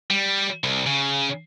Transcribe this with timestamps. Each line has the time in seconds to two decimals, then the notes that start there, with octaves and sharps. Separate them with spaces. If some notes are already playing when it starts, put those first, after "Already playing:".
0.10 G3
0.64 C2
0.87 C#3